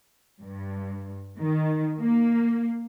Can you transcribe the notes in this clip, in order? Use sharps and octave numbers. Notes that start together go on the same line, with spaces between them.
G2
D#3
A#3